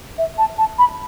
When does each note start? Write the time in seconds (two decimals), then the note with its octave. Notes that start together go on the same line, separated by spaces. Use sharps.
0.18 E5
0.38 A5
0.58 A5
0.78 B5